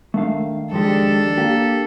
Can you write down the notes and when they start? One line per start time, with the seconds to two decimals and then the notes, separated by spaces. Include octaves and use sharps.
0.14 D#3 A3 D4 F5
0.72 F2 G#3 D4 G4 A4
1.38 A#3 G4